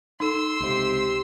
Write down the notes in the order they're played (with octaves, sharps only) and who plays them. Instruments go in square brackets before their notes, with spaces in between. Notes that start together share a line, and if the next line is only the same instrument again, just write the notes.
[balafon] D#4 A4 [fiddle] C6 E6
[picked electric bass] C#2 C3 [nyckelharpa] G4